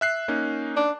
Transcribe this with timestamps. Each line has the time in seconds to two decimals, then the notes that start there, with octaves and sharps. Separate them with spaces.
0.01 E5 F#6 C7
0.28 A#3 C#4 D#4
0.76 D4